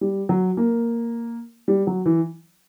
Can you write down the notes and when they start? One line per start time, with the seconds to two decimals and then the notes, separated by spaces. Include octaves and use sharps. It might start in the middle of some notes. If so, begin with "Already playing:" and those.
0.01 G3
0.29 F#3
0.57 A#3
1.68 G3
1.87 F#3
2.06 E3